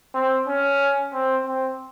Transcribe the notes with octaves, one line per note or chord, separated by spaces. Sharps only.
C4
C#4
C4
C4